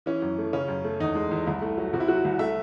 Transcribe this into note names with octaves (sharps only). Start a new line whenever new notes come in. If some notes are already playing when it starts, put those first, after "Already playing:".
E3 C#4
F#2
A3
C#3 C#4
F#2
A3
E2 D#4
G#3
E2
C2 E4
A3
F#3
C3 F#4
E4
F#3 F#4
C2
A3 E5